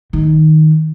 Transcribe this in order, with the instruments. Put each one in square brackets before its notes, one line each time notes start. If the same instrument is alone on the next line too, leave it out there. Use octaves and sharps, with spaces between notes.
[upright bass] D#3